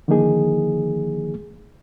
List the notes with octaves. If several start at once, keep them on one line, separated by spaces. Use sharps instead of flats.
D3 D#3 F3 A#3 D#4 G#4